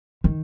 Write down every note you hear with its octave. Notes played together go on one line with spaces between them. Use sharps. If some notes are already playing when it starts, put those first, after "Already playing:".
D#3